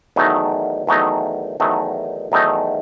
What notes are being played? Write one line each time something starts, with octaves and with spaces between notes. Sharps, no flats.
E2 D#3 F#3 A3 D#4
E2 D#3 F#3 A3 D#4
E2 D#3 F#3 A3 D#4
E2 D#3 F#3 A3 D#4